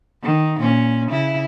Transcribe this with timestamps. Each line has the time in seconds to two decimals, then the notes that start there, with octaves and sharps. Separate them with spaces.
0.23 D#3
0.60 A#2 C#4
1.10 C#3 E4